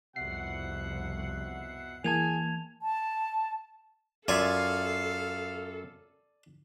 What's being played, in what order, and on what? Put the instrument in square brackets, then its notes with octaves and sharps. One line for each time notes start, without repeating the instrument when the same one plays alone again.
[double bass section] C2 F2 [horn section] B2 E5 F#5 [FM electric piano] C7
[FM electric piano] E3 A#3 [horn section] G#4 G#5 [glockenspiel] A5 G#6 F7
[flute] A5
[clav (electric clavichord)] F#2 F4 E5 [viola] A4 [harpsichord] D5 G#5 [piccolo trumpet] F5